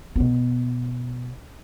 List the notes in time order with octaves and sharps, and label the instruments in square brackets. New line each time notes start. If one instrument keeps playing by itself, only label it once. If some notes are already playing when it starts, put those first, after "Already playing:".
[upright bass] B2 B3